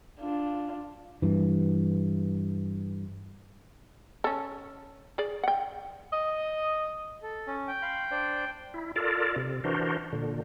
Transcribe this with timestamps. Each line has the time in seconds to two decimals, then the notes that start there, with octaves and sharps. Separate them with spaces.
0.20 D4 F4
1.22 G2 E3
4.24 C#4 A4
5.18 G#4 D5
5.44 F#5 G5
6.13 D#5
7.23 A4
7.47 C#4
7.68 G5
7.82 F5 B5 C6
8.11 D4 C5 D5
8.74 E4
8.96 F4 A4 A#4 D5
9.36 C3
9.64 E3 D4 F#4 A#4 C5
10.13 A#2 D3